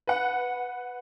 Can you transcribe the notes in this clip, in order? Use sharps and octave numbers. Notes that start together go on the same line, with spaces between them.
B4 F#5